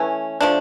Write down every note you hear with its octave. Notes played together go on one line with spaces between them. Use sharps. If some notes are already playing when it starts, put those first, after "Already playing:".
Already playing: E3 A3 C#4
F3 A3 D4